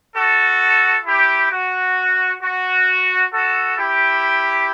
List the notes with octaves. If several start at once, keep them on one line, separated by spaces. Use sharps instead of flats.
F#4 A4
E4 G4
F#4
F#4
F#4 A4
E4 G4